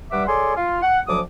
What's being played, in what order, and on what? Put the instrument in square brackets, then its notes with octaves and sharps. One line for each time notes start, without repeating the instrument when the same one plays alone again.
[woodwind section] G2 G3 E5 F#5 D6
G#4 A4 C#5 D5 C6
F4
F#5
D2 F3 F#3 D6 D#6